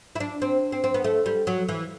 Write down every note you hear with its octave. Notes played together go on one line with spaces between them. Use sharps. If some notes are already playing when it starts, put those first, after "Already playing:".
E4
D4
C4
C4
C4
B3
A3
G3
F#3
E3